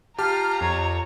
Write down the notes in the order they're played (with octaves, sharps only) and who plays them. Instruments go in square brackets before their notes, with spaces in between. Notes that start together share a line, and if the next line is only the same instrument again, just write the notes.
[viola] F4 [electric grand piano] G4 A5 [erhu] A#5 [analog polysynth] F6
[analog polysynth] F2 [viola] C#5